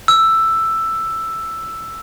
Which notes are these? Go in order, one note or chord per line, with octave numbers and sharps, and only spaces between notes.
E6